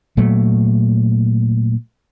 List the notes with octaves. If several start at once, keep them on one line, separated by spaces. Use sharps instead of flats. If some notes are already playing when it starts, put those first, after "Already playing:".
A#2 F#3 A3